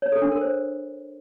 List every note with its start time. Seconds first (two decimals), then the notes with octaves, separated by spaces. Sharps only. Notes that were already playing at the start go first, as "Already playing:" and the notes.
0.02 C#5
0.12 A4
0.22 D4
0.32 A#4
0.41 C5